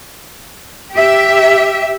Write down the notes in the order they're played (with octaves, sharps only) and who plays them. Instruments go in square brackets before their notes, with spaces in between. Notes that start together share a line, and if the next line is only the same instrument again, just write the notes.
[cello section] G4 E5